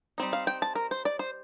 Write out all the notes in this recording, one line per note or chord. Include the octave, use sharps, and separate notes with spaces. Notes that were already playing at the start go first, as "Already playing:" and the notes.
G3 C4 D#4
F5
G5
A5
A#4
C5
D5
C5